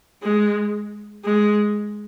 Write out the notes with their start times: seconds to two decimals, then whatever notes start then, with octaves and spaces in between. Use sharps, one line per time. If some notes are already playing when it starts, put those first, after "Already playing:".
0.22 G#3
1.24 G#3